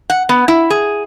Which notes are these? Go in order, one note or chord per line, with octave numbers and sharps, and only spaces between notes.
F#5
B3
E4
G#4